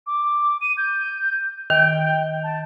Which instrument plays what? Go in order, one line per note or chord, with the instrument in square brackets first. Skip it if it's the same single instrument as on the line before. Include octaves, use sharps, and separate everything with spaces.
[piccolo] D6
D#7
G6
[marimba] D#3 [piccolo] G5
[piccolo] A5